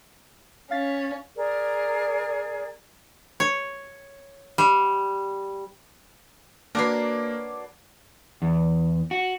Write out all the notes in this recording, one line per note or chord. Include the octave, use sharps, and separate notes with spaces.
C#4 F5 A6 B6
G#4 A#4 D5
C#5
G3
A#3 D4 F#4 A#4 B4 C#5 D6 C7
E2
F#4